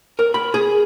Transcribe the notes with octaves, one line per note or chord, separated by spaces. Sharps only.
A#4
B5
G#4